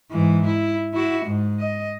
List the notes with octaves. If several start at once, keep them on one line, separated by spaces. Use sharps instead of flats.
G#2 E3
E4
E4 F#4
G#2
D#5